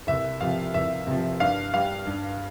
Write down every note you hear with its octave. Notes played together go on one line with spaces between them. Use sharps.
C2 E5
C3 F3 F5
C2 E5
C3 F3
G2 F5
G3 F5
G2